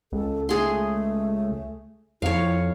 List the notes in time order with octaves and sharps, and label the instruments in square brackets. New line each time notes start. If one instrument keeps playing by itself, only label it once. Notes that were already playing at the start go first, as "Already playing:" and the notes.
[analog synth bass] C#2 [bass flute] A4
[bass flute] A3 [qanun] G#4 C6
[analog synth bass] F2 [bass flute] E4 [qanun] C#5 F5